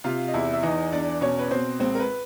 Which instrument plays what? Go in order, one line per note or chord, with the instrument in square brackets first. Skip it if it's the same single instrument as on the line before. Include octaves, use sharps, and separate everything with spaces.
[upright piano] C3 F4 F5
D#5
E2 E4 E5
E5
E3 D#4 D#5
E2 D4 D5
B2 C#4 C#5
B4
B2 C4 C5
C#2 C4 C5
A#4
B4